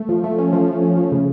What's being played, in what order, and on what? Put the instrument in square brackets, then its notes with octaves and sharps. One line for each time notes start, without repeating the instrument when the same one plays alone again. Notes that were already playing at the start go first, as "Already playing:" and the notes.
Already playing: [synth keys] A3
F3
A3
C#4
F3
F3
C#4
F3
C#3